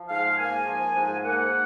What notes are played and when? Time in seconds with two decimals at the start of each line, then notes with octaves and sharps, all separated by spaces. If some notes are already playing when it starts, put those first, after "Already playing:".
Already playing: F3
0.09 G#2 F5
0.39 A#3 G#5
0.66 F3
0.95 G#2
1.24 A#3 F#5